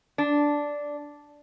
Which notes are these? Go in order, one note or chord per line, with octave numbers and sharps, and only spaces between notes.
D4